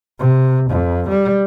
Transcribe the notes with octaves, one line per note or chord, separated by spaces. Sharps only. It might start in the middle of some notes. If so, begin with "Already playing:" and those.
C3
F2
G3